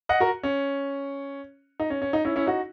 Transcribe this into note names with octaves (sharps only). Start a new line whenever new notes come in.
D#5 F#5
F#4 A#4
C#4
D#4
C#4
C#4
D#4
C#4 E4
C#4 E4
D#4 F#4